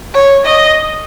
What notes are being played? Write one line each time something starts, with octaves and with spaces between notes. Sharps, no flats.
C#5
D#5